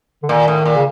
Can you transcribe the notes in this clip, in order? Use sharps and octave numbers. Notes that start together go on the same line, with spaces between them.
D3
A#2 D#3
A2
A#2
C#3